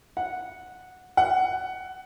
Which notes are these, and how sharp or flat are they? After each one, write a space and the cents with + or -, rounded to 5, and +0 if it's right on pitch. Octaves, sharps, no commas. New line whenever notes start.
F#5 -10
F#5 +10